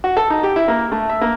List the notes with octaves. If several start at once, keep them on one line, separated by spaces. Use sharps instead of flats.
F#4
A4
D#4
G4
E4
A#3
A3
E5
A#3